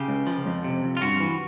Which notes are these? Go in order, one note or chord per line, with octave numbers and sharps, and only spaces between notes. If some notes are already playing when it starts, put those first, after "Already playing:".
Already playing: C#3 G4
C#2
F3
F2
C3
F2
F4
G2 F#4
E3